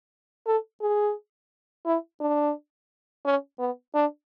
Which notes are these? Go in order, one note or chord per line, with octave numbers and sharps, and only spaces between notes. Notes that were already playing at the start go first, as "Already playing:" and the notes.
A4
G#4
E4
D4
C#4
B3
D4